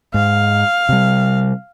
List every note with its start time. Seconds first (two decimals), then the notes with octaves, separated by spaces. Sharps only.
0.14 G#2 F5
0.89 C3 G3